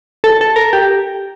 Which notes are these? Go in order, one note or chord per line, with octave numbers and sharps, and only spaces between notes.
A4
A4
A#4
G4